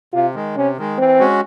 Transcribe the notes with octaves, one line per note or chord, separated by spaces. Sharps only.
C3 F4
D#3 G#3
C3 C#4
D#3 G#3
E3 C4
G#3 C#4 F#4